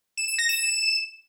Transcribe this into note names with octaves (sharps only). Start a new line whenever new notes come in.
E7
E7
A#6
E7